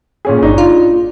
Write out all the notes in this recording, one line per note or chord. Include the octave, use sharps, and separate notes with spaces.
A#2 C#4 G#4
G1 D4 D#4
F4